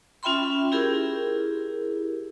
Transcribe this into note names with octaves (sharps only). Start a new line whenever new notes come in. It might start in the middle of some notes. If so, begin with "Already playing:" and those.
C#4 F4 E5 G5 B5 C6
E4 G4 G#4 A#4